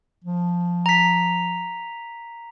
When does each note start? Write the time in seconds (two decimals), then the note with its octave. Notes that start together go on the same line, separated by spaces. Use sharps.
0.25 F3
0.86 A#5 B6